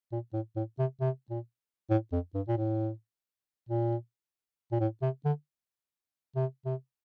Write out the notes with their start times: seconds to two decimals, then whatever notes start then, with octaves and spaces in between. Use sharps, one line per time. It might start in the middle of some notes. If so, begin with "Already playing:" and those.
0.12 A#2
0.33 A2
0.56 A2
0.79 C3
1.00 C3
1.30 A#2
1.90 A2
2.12 F2
2.34 G2
2.48 A#2
2.57 A2
3.69 A#2
4.72 A#2
4.80 A2
5.02 C3
5.25 D3
6.36 C3
6.65 C3